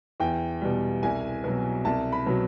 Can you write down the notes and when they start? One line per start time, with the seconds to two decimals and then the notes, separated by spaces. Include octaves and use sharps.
0.20 E2 G5
0.62 B2 G3
1.03 C2 G#5
1.44 B2 F#3
1.85 C2 A5
2.12 B5
2.26 B2 F#3